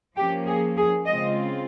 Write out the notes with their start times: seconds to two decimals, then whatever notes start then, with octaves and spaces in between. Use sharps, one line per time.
0.16 F3 A#3 C#4 G4
0.47 G#4
0.77 G#4
1.06 C#3 G#3 C4 F4 D#5